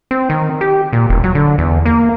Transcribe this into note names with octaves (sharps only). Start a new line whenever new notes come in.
C4
D#3
G4
A#2
E1
F#3
D3
E2
A#3